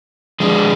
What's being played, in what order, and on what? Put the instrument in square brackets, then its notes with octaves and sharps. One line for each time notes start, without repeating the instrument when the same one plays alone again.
[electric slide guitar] F3 G#3 D4